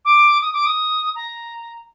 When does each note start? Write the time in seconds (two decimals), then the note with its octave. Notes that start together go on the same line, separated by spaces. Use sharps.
0.05 D6
0.42 D#6
0.53 D6
0.66 D#6
1.15 A#5